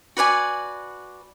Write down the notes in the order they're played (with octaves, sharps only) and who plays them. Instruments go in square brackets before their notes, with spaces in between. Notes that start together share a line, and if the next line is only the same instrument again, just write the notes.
[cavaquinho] F#4 B4 D5 G#5